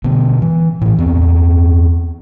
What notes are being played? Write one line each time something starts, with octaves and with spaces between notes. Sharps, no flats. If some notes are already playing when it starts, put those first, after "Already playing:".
B2 D3 B3
E3
A2 E3
E2 B3 C4